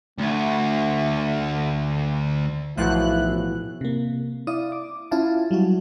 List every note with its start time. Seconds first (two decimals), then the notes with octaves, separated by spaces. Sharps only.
0.19 D2 A3
2.77 B1 A2 E3 F3 E4 F#4 F#6
3.81 C3 A#3
4.47 E4 D5 F5 D#6
4.72 D6
5.11 C#4 E4 F4 F5 G#5 A5
5.51 F#3 G3 E4 F#4